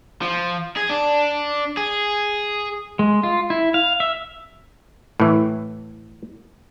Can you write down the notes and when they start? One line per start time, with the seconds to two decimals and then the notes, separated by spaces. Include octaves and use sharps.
0.22 F3
0.77 G#4
0.90 D4
1.77 G#4
2.99 G#3
3.23 F4
3.50 E4
3.74 F5
4.00 E5
5.20 A2 E3